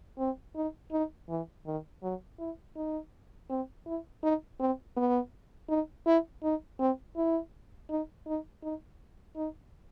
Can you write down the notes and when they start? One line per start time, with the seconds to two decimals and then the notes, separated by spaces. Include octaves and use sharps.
0.19 C4
0.56 D#4
0.92 D#4
1.29 E3
1.66 D#3
2.03 F#3
2.39 E4
2.76 D#4
3.50 C4
3.86 E4
4.23 D#4
4.60 C4
4.97 B3
5.69 D#4
6.06 E4
6.43 D#4
6.79 C4
7.16 E4
7.90 D#4
8.27 D#4
8.63 D#4
9.36 D#4